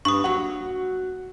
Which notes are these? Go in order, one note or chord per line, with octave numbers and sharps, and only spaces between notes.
G2 B3 D4 C#6 D#6
F#3 A#3 F#5